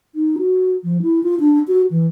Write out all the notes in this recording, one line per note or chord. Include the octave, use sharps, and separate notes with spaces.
D#4
F#4
F3
E4
F4
D4
F#4
E3